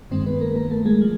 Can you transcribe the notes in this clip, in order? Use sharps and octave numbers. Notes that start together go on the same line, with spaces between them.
G2 D#3 G#3 C4 C5
B3 B4
A#3 A#4
A#3 A#4
A3 A4
G#3 G#4
F3